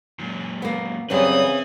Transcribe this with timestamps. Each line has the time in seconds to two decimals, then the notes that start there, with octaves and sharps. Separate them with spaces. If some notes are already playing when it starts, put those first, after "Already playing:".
0.19 F#2 A#2
0.62 A#3 B3
1.10 F#2 C#3 F#3 G3 C4 B4 E5 D#6